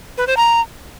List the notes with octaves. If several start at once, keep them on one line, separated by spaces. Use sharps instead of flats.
B4
C5
A#5